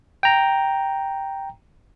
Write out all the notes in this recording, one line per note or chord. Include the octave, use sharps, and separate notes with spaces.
G5 A#5